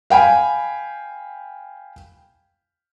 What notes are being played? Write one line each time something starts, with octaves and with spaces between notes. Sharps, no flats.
F5 G5 G#5 B5